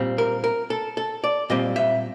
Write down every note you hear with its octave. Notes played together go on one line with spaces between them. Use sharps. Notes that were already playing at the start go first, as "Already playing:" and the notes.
Already playing: A#2 G3 C4
A#4
A#4
A4
A4
D5
A#2 G3 C4 D#5
E5